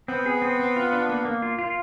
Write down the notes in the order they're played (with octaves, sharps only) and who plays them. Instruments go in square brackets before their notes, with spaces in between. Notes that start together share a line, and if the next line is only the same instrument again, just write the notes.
[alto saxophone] B3 [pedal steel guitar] C4
[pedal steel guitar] G#4
C4
C4
F4
D4
A#3
A#3
F4
F4